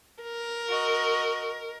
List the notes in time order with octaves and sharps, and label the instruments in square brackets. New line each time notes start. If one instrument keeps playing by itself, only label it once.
[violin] A#4
[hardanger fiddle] F#4 D#5